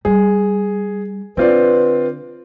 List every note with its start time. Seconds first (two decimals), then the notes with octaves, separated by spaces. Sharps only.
0.05 G3 G#4
1.37 D3 C4 F4 B4 D5